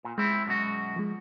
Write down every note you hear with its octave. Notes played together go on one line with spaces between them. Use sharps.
A#2
G#3 C4 E4
F#2 B2 F#4
F3 G#3